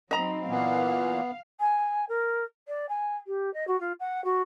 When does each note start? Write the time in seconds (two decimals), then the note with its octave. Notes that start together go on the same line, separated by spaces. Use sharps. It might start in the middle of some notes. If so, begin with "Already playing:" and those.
0.11 F#3 C4 D#4 D#5 A#5 B5
0.49 A#2 E3 B3 F5
1.60 G#5
2.09 A#4
2.67 D5
2.89 G#5
3.27 G4
3.53 D#5
3.67 F#4
3.80 F4
4.00 F#5
4.24 F#4